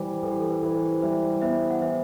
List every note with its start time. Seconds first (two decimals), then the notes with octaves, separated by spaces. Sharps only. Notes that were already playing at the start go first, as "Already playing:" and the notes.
Already playing: E3 G3 C5
0.23 E3 A4
0.32 G4
0.40 A4
0.50 B4
0.63 E3
0.76 C5
1.02 G3 C5 E5
1.42 B3 C5 E5
1.70 F#5
1.81 E3 C5 E5